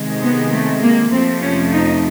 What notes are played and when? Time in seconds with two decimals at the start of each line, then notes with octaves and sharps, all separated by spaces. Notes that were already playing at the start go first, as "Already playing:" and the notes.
Already playing: C3 D#3 G#3
0.22 B3
0.53 A3
0.82 A#3
1.11 F2 C3 F3 A3 C4
1.42 C#4
1.71 D#4